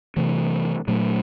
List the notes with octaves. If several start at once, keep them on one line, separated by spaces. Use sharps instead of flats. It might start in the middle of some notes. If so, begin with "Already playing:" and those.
C3 E3 A3
A#2 F#3 A3